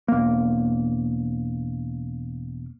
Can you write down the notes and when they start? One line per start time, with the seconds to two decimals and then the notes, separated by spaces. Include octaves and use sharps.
0.08 E1 A#3